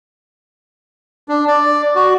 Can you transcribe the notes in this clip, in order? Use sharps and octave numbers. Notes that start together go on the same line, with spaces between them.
D4
D5
F#4